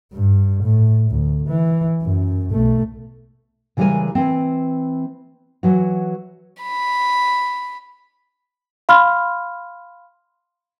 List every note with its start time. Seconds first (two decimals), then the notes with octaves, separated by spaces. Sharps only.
0.13 G2
0.64 A2
1.11 D2
1.48 E3
2.02 F#2
2.51 B1 A3
3.77 C#3 E3 G3 G#3 A#4 G#5
4.15 E3 C4
5.63 E3 F#3 F#4
6.63 B5
8.89 F5 B5 C6 F6